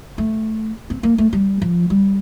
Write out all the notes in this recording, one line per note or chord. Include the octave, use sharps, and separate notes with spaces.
A3
C4
A#3
A3
G3
F3
G3